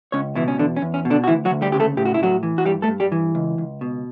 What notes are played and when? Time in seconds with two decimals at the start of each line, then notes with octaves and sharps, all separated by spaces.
0.12 C#2 C#4 C#5
0.35 B2 E3 E4
0.48 C#4
0.59 E2 D3 D4
0.76 C#4
0.82 E2
0.94 C#4
1.05 B2
1.10 D3 D4
1.24 F#4
1.27 D2 E3 E4
1.45 F#3 F#4
1.51 D2
1.62 G3 G4
1.72 C#3 G4
1.80 A3 A4
1.97 A2 G4
2.05 F#4
2.14 E4
2.19 A2 F#3 F#4
2.43 E3
2.58 F#4
2.65 G2 G3 G4
2.82 A3 A4
2.88 G2
3.00 G3 G4
3.12 E3
3.35 C#2
3.58 C#2
3.81 B2